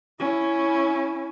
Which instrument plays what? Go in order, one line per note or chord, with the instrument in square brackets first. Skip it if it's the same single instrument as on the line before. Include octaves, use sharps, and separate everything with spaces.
[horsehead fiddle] C#4 E4